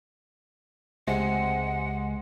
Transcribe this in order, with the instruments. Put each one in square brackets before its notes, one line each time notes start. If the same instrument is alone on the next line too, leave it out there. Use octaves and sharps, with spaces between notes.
[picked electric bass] C#2 [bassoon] C3 [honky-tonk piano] G#3 [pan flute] F#5